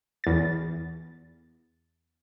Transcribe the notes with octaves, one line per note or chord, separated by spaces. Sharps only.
E2 A6